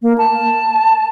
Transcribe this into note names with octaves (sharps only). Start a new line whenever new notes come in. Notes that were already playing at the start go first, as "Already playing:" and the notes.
A#3
A5